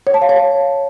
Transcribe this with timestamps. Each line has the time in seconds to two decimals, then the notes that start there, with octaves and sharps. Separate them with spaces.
0.07 C#5
0.14 A5
0.22 F5
0.29 C#5